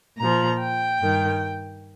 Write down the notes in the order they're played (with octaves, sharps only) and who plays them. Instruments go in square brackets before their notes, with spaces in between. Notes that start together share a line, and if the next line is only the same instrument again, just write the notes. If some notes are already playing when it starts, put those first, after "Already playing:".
[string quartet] A#2 F3 A#5
G5
G2 D#3